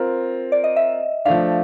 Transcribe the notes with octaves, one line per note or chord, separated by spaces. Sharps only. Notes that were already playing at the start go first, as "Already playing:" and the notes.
Already playing: C4 F4 A#4
D5
D#5
E5
F3 A3 D4 F5